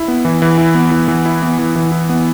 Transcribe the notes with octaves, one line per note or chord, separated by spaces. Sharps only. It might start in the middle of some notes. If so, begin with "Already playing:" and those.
Already playing: E4
B3
E3
E3
E4
B3
E3
E3
E4
B3
E3
E3
E4
B3